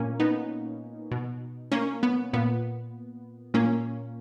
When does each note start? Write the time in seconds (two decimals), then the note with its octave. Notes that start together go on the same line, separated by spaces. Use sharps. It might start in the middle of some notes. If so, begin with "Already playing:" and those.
Already playing: A#2 A#3 C#4
0.20 B3 D#4
1.11 B2
1.72 A#3 C#4
2.03 B3
2.33 A#2 B3
3.54 A#2 A#3 C#4